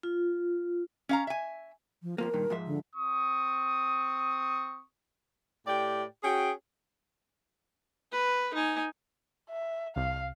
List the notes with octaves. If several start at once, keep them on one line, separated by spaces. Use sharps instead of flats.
F4
C#4 F5 A#5
E5 G#5
F3
F2 F3 A#3 A#4
G2 A#2 D#3
G#2 F3 E5
D3
C4 C#6 D#6
A2 G4 D5 G5
C#4 F#4 G#4 G5
B4
D#4 G#5
E5
C2 F5